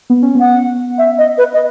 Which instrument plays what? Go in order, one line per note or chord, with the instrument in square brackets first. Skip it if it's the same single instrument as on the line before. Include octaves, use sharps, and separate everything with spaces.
[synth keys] B3
C#4
B3
[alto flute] F#5
E5
D#5
B4
D#5